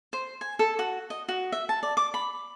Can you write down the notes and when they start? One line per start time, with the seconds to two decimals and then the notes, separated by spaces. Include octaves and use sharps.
0.13 C5
0.41 G#5
0.59 A4
0.79 F#4
1.10 D#5
1.28 F#4
1.52 E5
1.69 A5
1.83 D5
1.97 D6
2.14 B5